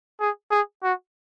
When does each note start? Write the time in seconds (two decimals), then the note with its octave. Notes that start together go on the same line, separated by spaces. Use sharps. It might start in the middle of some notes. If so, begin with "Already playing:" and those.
0.20 G#4
0.51 G#4
0.83 F#4